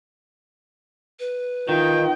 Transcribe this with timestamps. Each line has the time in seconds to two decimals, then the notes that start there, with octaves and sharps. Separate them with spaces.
1.20 B4
1.69 D#3 D#4 F4 G5